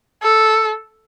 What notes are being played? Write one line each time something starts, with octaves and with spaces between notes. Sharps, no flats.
A4